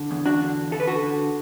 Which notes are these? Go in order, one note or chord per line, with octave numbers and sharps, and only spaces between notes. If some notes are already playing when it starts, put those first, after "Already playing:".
Already playing: D3
E2
D4 F#4
D3
D3 A4
B4
F#4 A4
D3